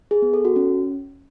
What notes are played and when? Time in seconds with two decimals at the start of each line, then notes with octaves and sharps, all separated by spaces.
0.11 G#4
0.22 B3
0.33 A4
0.45 F#4
0.56 C#4